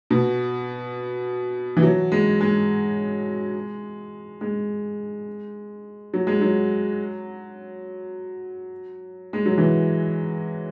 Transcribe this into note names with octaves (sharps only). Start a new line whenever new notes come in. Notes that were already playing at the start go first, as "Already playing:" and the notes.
B2
E3
F#3
G#3
G#3
G#3
F#3
G#3
F#3
G#3
F#3
E3